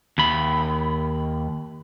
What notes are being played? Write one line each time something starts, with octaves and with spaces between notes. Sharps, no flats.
D#2 B5